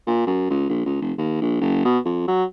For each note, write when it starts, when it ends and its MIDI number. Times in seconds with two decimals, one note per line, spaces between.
0.07 0.24 46
0.27 0.49 42
0.50 0.67 37
0.69 0.85 34
0.86 1.00 37
1.01 1.12 29
1.18 1.39 39
1.41 1.59 34
1.61 1.83 30
1.85 1.99 47
2.05 2.25 41
2.28 2.44 54